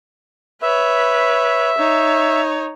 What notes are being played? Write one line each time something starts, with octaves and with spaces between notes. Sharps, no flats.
B4 C#5 E5
D#4 C#5